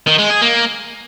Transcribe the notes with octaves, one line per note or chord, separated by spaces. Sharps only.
D#3
G#3
G#4
A#3